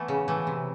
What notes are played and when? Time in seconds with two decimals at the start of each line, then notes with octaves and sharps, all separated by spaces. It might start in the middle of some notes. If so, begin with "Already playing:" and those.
Already playing: E3 A3 B3
0.08 C#3
0.28 E3 A3
0.47 C3